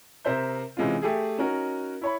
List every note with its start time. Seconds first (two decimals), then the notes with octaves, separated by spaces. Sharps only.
0.25 C3 A#4 C5 E5 G6
0.77 C3 E3 G#3 C#4 F4
1.02 A3 G4 G#4
1.38 C#4 D#4 F#4 A#4
2.01 E4 C#5 B5